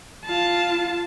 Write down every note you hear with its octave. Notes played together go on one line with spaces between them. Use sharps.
F4 A5